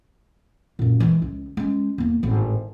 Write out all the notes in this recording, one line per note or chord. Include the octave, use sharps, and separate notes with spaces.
F#2 A#2
E3 G#3
C#2
G#3 C#4
E2 A#3
G#1 A2